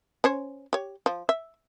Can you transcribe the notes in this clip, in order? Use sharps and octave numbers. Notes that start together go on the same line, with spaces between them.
C#4 C5 C#5
G4 C#5
F3
E5